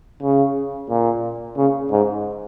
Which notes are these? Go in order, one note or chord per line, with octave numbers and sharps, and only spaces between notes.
C#3
A#2
C#3
G#2